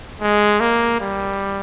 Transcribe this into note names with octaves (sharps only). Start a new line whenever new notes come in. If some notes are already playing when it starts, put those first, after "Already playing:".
G#3
A#3
G3